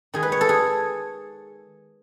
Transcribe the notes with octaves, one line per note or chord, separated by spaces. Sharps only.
D#3 G#3 G#4
B4
C#5
A4
G#4